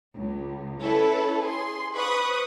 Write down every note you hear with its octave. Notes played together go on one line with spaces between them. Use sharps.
C#2
C#4 E4 A4 B4 C#5
G#4 C6
B4 C5 B5 C#6 D#6 F#6